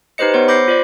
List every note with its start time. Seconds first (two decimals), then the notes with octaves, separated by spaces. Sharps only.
0.18 D#4 G4 B4 C5 D#5 C#7
0.34 B3 C5 C#5
0.48 B5 D6 G6 A#6 C7 C#7
0.68 F4 C5 D5